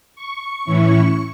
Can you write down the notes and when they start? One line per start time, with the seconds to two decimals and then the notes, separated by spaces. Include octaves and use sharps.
0.16 C#6
0.65 A2 E3 C#4 E4